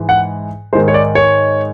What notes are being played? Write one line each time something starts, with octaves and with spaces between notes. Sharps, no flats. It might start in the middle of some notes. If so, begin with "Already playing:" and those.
Already playing: G#2 E3 G#3
F#5
G#2 D#3 G#3 C5
C#5
D5
C#5